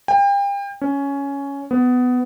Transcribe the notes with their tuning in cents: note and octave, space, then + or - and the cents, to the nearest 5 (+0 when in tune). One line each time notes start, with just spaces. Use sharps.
G5 +35
C#4 +10
B3 +15